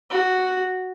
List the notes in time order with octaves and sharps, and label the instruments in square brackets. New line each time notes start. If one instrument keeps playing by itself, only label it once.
[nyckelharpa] F#4